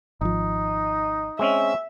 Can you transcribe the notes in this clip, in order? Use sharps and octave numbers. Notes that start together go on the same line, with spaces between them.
G#1 F3 D#4
G#3 C4 C#4 E5